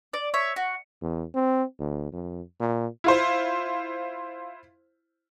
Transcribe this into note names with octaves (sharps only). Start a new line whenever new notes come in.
D5
C#5 E5
F#4
E2
C4
D2
F2
A#2
E4 F4 C5